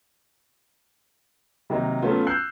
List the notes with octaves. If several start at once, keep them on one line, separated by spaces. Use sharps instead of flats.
C3 D#3 F#3 A#3 D#4
F#3 A3 B3 C#4 F4
E6 F#6 G6 C7